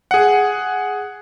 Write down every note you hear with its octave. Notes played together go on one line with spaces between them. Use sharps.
G#4 F#5